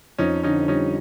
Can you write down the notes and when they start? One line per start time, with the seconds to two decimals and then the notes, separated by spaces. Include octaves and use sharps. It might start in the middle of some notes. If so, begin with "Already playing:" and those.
0.18 F2 C#4 D#4
0.43 D3 C#4 D#4
0.68 G3 C#4 D#4